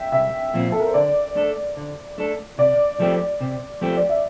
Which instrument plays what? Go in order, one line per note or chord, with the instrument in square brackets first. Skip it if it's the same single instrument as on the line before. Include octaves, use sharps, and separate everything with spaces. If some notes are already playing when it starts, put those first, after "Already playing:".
Already playing: [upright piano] E5 G5
[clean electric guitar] C2 [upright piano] E5
[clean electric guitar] A#2 F3 C4
[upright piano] A4
A#4
C5
[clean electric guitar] D3 [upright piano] D5
[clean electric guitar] A3 D4 A4
D3
A3 D4 A4
[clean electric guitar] C3 [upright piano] D5
[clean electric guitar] F3 A3 C4 G4
C3
F3 A3 C4 G4
[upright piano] D5
E5